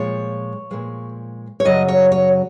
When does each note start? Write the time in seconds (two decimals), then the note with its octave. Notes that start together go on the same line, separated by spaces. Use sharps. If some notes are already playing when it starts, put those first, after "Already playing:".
Already playing: A#2 F3 G#3 C#5
0.71 A#2 F3 G#3
1.60 C#5
1.65 F#2 C#3 F#3 D#5
1.88 C#5
2.12 C#5